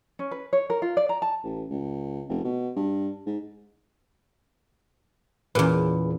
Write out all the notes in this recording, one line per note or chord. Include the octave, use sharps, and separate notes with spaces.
C#4
B4
C#5
A#4
F4
D5
A#5
A5
A1
C#2
F1
B2
G2
G#2
E2 A#2 C#4 G#4 B4